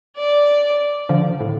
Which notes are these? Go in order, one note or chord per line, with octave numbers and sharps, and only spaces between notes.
D5
D3 F3
A2